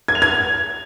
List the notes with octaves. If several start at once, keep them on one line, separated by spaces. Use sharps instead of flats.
G#6
F7
G#6